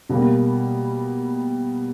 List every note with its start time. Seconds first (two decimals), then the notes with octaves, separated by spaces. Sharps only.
0.09 B2 G3 A#3